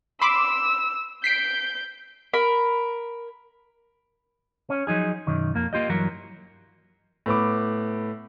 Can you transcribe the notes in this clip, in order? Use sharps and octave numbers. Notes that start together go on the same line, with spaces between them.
B5 C6 D6 E6
G6 B6 C7 D7
A#4 B5
C#4
F3 F#3 D#4 G#4
B1 F#2 D#3
F2 A#3
A#3 F4 G4 D#5
G2 E3 F#3 A#4
A2 B3 B5 D6